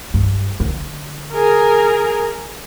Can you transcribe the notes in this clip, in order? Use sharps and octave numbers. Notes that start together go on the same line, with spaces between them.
G2
D3
G#4 A#4